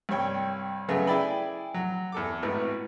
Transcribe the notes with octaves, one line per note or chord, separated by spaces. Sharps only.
C2 G2 C#5 G5
C#3 F#3 A3 B3 G#4
E4 G#4 D5 G5 B5
F#3
E2 A4 D6
G#1 A2 B3